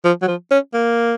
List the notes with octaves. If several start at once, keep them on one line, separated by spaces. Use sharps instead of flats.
F3
F#3
F3
C#4
A#3